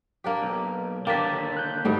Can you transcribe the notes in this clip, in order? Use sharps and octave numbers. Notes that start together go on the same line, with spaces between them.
A#3 D4 G4
B1
D#2 D3 A#3 D4 G5 A6 B6
F#6 G6
G#2 B2 G3 A3